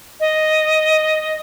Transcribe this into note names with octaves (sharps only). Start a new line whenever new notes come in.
D#5